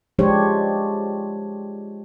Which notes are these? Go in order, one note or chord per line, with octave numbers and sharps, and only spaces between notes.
F3 G#3 D4 G4 C5 C#5